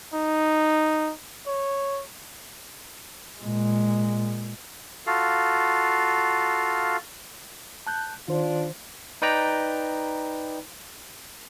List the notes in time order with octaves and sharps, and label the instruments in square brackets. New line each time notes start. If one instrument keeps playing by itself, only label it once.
[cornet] D#4
C#5
[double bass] A#2 G#3
[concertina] F4 F#4 A4 F5
[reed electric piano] A5 F#6 G6
[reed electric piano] D#3 C5 [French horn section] D4 F4
[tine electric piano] D#4 B4 D5 G5 A#5 B5